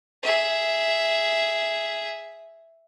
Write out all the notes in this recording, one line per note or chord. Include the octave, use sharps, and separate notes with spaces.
G#4 E5